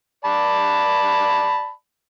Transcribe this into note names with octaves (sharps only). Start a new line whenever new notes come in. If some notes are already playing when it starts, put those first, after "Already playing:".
D5 A5 B5